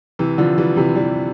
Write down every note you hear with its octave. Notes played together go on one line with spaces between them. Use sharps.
C3 E3
D3 F3
E3 G3
C3 E3
E3 G3